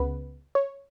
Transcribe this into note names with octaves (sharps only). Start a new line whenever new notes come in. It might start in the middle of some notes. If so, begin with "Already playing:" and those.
Already playing: C#2 C#3 B3 B4
C#5